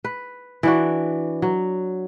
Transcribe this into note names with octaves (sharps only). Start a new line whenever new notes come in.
B4
E3 D4 F#4
F#3